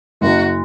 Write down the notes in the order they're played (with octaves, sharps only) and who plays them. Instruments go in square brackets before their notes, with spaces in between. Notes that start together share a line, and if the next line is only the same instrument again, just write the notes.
[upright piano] F#1 [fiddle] F#4